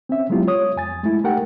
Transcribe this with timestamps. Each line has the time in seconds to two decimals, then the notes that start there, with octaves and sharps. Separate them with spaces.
0.09 C4 C#4 E5
0.29 F#3 G#3 B3 E4 F4 G4
0.48 C#5 D#6
0.76 F2 G#5 A6
1.03 G#3 A3 E4
1.24 A3 D#4 G4 A#4 F#5 G5